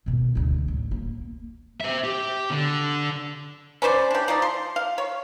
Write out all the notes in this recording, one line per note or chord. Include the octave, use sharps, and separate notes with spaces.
D#2 B2
D2 G#2
A1
A#3
C5 E5
G4
D3
C#4 B4 C5 D5
D4 G4
F3 D#4 D5
C6
F5
C#5